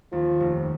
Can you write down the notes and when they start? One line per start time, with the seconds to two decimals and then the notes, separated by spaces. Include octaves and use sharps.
0.12 D#2 F3
0.40 F1